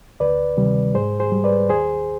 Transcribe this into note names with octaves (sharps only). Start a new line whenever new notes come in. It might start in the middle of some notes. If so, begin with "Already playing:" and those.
D2 B4 D5
C3 D#3 G3
G#2 G#4 C5
G#4 C5
G3
B4 D5
D#2 G#4 C5